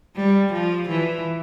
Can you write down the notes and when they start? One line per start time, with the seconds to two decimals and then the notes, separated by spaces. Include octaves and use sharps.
0.16 G3
0.52 F3
0.89 E3